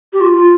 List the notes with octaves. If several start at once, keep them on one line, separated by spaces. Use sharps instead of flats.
G4
F4
F4